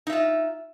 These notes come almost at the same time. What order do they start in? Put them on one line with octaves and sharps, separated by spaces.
D#4 E5 F4